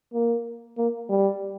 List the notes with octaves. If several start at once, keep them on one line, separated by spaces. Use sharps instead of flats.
A#3
A#3
G3